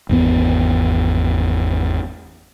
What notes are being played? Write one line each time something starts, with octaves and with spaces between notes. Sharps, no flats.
G#1 E2 B3